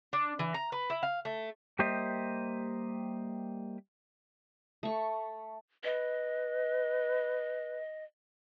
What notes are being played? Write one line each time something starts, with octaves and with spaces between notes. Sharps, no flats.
D4
E3
A#5
B4
E4
F5
A3
G3 A#3 G4 C5 D#5 E5
A3 C#6
B4 D#5